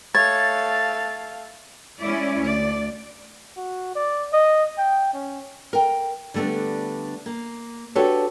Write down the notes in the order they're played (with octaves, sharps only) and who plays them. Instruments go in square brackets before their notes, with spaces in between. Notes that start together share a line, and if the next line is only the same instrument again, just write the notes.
[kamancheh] A3 F5 [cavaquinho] C#5 [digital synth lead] A6
[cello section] G#3 C#4 E4 D5
D2 D5
[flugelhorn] F#4
D5
D#5
G5
C#4
[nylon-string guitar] A#4 G5
D3 G3 A3 B3 D4
A#3
D4 F#4 G4 A4 B4 C#5